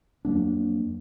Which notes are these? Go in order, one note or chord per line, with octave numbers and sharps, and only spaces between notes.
F2 F#3 A#3 D4